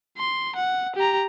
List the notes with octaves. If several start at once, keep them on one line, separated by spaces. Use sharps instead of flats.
C6
F#5
G4 A#5